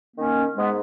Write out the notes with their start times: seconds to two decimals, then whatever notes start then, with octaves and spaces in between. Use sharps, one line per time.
0.16 D#3 A#3 C#4
0.56 G#2 G#3 B3